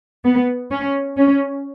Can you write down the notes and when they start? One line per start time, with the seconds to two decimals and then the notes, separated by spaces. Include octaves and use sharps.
0.25 B3
0.71 C#4
1.17 C#4